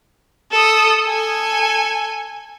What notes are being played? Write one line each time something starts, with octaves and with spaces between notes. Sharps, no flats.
A4 D#6
A4 G#5